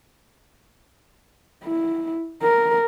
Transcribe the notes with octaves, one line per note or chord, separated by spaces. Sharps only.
E4
A#4